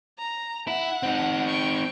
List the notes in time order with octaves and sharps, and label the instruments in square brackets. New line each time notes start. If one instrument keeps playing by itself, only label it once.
[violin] A#5
[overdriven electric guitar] E4 [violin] F#5
[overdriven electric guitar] C4 D#4
[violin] G5 C#6